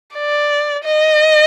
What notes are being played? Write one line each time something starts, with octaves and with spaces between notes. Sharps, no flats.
D5
D#5